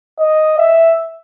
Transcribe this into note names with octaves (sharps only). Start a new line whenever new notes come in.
D#5
E5